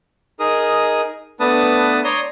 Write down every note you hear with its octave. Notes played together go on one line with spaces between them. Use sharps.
D#4 G#4 A#4 D#6
A3 B3 D4 B4 A5 D#6
C#5 D5 A#5 C6 D#6